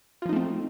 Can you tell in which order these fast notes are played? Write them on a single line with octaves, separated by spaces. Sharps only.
F4 F3 D#4 A3 C4